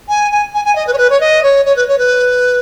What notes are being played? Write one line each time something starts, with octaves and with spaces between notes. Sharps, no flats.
G#5
G#5
G#5
G#5
D#5
B4
C#5
B4
C#5
D#5
C#5
C#5
B4
C#5
B4